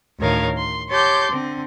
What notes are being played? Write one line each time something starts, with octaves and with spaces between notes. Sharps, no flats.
D2 A2 D#3 A#4 C#5 F5
C6
G4 C#5 A5 C6 D6 G6
D3 C4